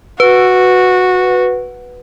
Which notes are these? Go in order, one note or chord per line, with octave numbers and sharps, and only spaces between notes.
F#4 B4